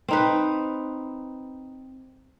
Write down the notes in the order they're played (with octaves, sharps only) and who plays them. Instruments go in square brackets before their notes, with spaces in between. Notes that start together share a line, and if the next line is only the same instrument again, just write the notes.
[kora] C4 D#4 B4